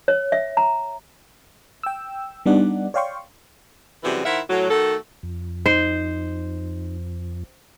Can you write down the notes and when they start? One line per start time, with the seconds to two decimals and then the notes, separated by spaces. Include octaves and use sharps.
0.08 C#5
0.32 E5
0.57 A#5
1.83 G5 E6
2.46 G3 B3 D4 D#4 D5 F#5
2.94 C#5 D5 F5 G5 C6 C#6
4.03 F#2 C3 E3 G3 F#4 G#4
4.25 D#3 E4 A#4 C5 E5 F#5
4.49 A2 F#3
4.70 D#3 A3 F#4 A4
5.23 F2
5.66 D#4 C5